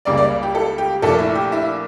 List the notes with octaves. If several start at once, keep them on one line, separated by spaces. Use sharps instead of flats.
C#2 C#3 G3 A#3 D5
D5
G4
A4
G4
A#1 A#2 A3 A4
E4
G4
E4